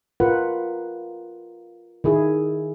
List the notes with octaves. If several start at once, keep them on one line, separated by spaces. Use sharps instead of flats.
F4 A#4 B4 F#5
D#3 E4 G#4